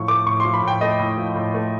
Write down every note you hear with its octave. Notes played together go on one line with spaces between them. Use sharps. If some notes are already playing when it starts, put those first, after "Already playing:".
Already playing: A2 F3 C#6
A3 D6
A2 C#6
C6
F3
B5
A2 G5
A3 D#5
A2
F3
A2
A3